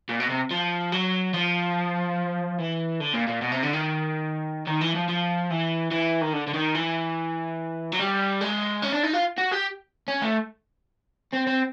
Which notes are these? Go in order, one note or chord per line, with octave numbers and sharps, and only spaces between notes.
A#2
B2
C3
F3
F#3
F3
E3
D3
A#2
A#2
B2
C3
D3
D#3
D#3
E3
F3
F3
E3
E3
D#3
D3
D3
D#3
E3
F#3
G3
G#3
C#4
D4
D#4
F4
F#4
G4
C#4
A3
C4
C4